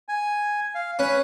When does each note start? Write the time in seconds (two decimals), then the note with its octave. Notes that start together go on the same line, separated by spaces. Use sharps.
0.09 G#5
0.75 F5
0.99 C#4 B4